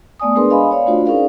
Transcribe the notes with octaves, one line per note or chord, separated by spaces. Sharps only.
A3 B3 D5 G#5 D#6
G#3 D4 G#4 A#4 B4 C6
D#5 F5 G#5 B5
C#5 D5 F5
A3 D4 F4 F#4 C5
C#4 D#4 G#4 A#4 D5 F5